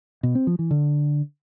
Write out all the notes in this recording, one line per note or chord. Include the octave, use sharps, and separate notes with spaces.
B2
C4
F3
E3
D3